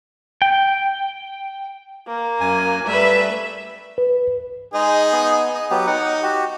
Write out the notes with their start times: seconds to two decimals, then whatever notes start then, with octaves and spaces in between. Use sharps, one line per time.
0.42 G5
2.08 A#3
2.40 F#2 G#5
2.87 G3 A3 B4 E5
3.98 B4
4.74 G#3 D#4 G#4
5.12 B3
5.55 D#5
5.71 F#3 B3 G4
5.87 D#4 F#5
6.23 F#4 G4